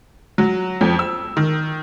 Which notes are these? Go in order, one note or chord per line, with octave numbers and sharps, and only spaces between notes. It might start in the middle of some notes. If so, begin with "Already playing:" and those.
F#3
F2
E6
D#3